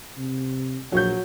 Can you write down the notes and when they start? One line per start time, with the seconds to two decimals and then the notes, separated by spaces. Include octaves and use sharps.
0.18 C3
0.92 A#1 F#3 C#5 G6